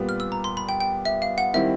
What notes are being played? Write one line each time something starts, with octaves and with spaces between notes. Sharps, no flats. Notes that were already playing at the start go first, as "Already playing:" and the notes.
Already playing: A#2 G3 B3
F6
E6
A#5
C6
B5
G5
G5
E5
F5
F#5
D#3 G3 C4 E4 E5